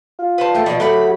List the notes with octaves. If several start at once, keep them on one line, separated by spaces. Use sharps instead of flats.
F4
B4 C5 A5
A3 G5
B2 F3 D5 D#5
F#3 A3 G4 F#5 B5